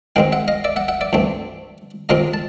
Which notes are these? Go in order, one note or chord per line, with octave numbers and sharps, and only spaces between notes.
G#2 D#3 G#3 C4 F5 G5
E5 F#5
D#5 F5
D5 E5
E5 F#5
E5 F#5
D5 E5
G2 E3 A3 C4
C3 D#3 G#3 C4 F4 D#5 F5
A5